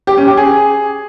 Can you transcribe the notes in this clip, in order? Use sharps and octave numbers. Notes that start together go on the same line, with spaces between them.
G4
C#4
G4
G#4